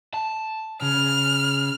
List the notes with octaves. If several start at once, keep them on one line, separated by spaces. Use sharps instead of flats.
A5
C#3 F6